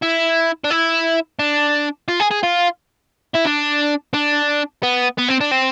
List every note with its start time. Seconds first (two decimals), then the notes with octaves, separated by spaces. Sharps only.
0.02 E4
0.64 D4
0.71 E4
1.39 D4
2.09 F4
2.20 G#4
2.31 G#4
2.43 F4
3.35 E4
3.46 D4
4.14 D4
4.83 B3
5.18 B3
5.28 C4
5.40 D4
5.51 C4